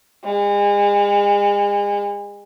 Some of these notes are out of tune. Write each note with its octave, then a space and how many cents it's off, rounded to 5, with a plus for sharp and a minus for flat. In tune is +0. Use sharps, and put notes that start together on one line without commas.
G#3 -35